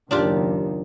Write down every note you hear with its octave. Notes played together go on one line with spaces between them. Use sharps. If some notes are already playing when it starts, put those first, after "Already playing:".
F#1 D#2 D#3 D4 F4 G4